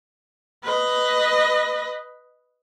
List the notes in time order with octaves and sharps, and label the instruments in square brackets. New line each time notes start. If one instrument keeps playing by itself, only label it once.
[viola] B4 D#5